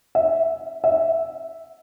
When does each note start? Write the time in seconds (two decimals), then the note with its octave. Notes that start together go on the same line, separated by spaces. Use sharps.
0.15 E5
0.84 E5